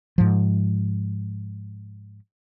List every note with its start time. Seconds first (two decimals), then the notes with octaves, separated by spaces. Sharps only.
0.18 G#2 F3